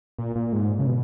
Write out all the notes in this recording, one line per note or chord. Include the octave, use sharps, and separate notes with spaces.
A#2
A#2
G#2
C#3
B2